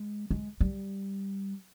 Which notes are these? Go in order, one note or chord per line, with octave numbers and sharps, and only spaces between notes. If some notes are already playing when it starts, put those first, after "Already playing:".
Already playing: G#3
G#3
G3